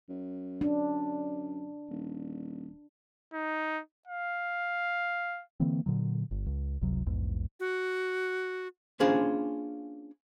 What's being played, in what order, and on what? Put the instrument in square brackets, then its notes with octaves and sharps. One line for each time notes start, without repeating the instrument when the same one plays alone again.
[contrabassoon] F#2
[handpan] D4
[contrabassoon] D#1
[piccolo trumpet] D#4
F5
[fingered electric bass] D3 E3 A#3 C4
A#2 D3 F#3
G1
C#2
G1 C#2 C3 F#3
A#1 E2 G#2
[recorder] F#4
[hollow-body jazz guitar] A#3 C#4 D4 F4 G#4 C5